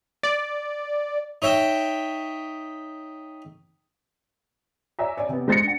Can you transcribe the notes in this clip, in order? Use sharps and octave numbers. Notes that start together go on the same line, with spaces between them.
D5
D#4 C#5 E5 G5
C#5 D5 E5 G#5 A#5
C#5 D5 G#5
C3 B3
G#3 C5 A6 A#6 C#7
D4 F#5